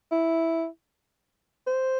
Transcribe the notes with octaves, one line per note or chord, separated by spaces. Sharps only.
E4
C5